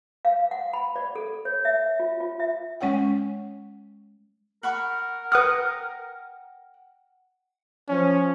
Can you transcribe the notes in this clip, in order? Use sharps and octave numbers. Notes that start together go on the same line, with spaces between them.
F5
F#5
B5
D5
A4
C#5
E5
F4
F4
E5
G#3 C#4 C#5 F#5 G5
A#4 F#5 B5 C#6
B4 F#5 G5 D#6 F6
F3 C#4